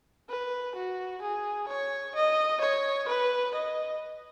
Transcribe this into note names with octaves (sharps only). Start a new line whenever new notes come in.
B4
F#4
G#4
C#5
D#5
C#5
B4
D#5